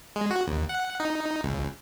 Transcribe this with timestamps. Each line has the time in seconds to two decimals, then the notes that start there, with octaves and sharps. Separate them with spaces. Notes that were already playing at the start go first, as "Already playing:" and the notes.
0.16 G#3
0.31 F#4
0.47 D#2
0.69 F#5
1.00 D#4
1.44 C#2